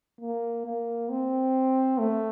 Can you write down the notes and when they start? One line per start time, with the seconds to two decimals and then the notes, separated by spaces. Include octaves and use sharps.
0.21 A#3
0.66 A#3
1.10 C4
1.99 A3